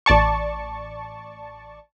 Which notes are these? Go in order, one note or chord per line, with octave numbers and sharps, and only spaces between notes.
A1 D5 A5 C#6